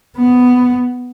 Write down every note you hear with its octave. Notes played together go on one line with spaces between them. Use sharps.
B3